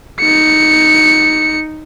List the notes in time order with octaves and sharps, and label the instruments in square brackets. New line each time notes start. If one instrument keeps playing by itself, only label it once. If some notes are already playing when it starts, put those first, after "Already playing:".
[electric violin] D#4 C#7